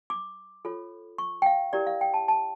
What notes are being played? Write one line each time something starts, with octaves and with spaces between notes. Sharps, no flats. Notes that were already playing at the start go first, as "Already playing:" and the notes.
D6
F4 A4 C#5
C#6
G5
F5
E4 G4 A#4 D5
F5
G5
A5
A5